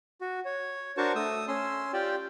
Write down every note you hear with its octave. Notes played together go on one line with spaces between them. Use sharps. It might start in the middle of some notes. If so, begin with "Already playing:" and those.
F#4
C#5
D4 F#4 A#4 C5 A5 C#6
A3 D#6 E6
C#4 C6 E6
F4 G4 D5 G5